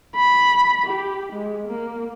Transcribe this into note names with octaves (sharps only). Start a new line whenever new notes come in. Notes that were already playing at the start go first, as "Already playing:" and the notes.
B5
G4
G#3
A#3